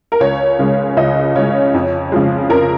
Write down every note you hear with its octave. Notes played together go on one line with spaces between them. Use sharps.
A#4
C#2 C#5
C#3 G#3
C#2 D#5
C#3 G#3 C#5
F2
C#3 F3 G#3
F2 A#4